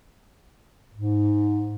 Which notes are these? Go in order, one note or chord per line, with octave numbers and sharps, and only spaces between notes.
G#2